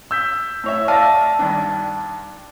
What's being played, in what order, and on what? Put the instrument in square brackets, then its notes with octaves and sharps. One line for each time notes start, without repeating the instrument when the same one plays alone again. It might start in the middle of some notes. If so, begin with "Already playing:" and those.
[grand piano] E6 G6 B6
[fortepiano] A2 C#5 E5
[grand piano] D5 A#6 [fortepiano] E5 F5 [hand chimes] A5
[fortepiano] G2 D#3 D4